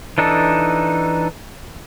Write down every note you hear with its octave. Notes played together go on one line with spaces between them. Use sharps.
E3 D4 D#4 A4